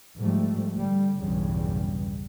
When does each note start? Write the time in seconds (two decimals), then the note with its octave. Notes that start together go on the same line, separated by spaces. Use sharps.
0.18 G#2 F3 G3 A3
0.77 D3 G3
1.19 B1 E2 G2 C#3 G3